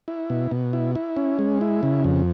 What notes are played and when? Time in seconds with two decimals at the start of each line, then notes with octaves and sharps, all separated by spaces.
0.08 E4
0.30 B2
0.51 B2
0.73 E4
0.95 E4
1.17 C#4
1.39 G#3
1.61 E4
1.83 C#3
2.04 F2